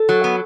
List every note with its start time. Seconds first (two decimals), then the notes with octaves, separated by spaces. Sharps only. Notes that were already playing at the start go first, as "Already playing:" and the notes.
Already playing: A4
0.09 F#3
0.24 B3